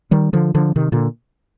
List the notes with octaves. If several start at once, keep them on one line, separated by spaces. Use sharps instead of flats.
D#3 G3
D3 F3
D3 F3
C3 D#3
A#2 D3